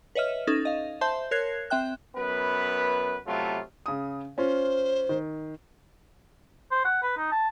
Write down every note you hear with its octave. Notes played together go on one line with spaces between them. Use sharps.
B4 C#5 D#5 E5 F6
C#4 D#4 A4 A6
D#5 F5
C5 E5 A5 C6 G6
A#4 C#5 F#6 G#6 C7
C4 E5 G5 F#6
F#2 B3 B4
C3 F#3 A3 B3 F4
C#3 D#6
C#4 F4 C5
D#3
C5
F#5
B4
D#4
A5